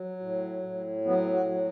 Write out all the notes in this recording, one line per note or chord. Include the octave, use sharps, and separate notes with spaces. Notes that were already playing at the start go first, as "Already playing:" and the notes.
Already playing: F#3
A2
A2
F#3 B3
F#4
F#3